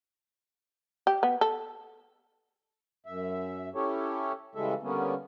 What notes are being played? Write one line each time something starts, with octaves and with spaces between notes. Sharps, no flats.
G4
B3
A4
F#2 E5
C#4 E4 G4 A4 C#5
C#3 E3 G3 G#3 A4 E5
D3 G3 A#3 B3 C#4